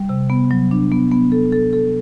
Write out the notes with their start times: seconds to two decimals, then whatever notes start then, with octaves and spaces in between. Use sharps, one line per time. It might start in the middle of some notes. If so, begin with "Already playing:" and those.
Already playing: G3
0.09 C3
0.30 B3
0.51 F#3
0.71 D4
0.92 B3
1.11 B3
1.32 A4
1.52 A4
1.73 A4